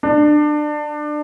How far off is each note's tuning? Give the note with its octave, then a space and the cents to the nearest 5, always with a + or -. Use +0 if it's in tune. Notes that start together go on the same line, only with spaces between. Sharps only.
D4 +25